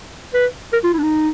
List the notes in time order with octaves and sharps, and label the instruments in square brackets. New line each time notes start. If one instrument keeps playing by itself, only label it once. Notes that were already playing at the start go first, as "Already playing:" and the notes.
[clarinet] B4
A#4
F4
E4
D4
D#4